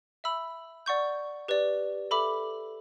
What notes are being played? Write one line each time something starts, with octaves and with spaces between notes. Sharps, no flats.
E5 B5 E6
D5 F#5 C#6 G6
G4 B4 D5
A4 E5 B5 D6